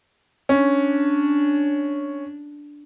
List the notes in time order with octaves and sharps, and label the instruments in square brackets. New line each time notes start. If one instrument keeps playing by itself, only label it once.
[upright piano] C#4 [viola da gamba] D4